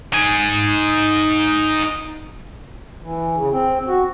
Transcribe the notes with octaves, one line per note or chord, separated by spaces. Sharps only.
D#4 G#5
E3
C#3
C4
F#4